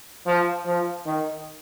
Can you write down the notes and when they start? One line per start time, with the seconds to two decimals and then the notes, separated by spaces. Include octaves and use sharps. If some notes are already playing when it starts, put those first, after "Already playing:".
0.26 F3
0.66 F3
1.06 D#3